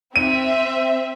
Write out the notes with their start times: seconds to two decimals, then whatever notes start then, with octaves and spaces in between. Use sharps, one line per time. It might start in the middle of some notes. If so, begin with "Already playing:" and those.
0.16 C4 E5 D#7